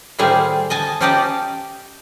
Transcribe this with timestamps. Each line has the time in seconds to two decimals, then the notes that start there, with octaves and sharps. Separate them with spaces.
0.19 A2 D#3 G3 G#4 C5 F5
0.70 D#5 G#5 A5
1.01 C#4 D#4 G4 D5 D#5 A5